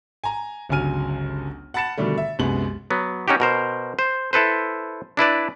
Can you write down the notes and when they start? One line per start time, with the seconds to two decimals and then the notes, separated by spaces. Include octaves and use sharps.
0.24 G#5 A#5
0.69 G1 C#2 F#3 G#5 F6 D#7
1.74 F#5 A5 B5 A6 C#7 E7
1.97 B2 D3 D#3 G3 A3
2.18 E5
2.39 C2 F#2 G#3 B3 F#7
2.90 F#3 B3
3.28 C#4 D#4 F#4 G4
3.40 B2 A#4 C5
3.99 C5
4.33 E4 A4 B4 C5
5.17 D4 E4 B4 D5